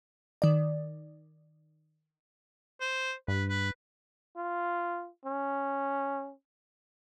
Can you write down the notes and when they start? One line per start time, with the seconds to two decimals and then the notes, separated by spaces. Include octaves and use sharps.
0.42 D#3 D5
2.81 C5
3.28 G2 B4
3.49 B4
4.37 F4
5.25 C#4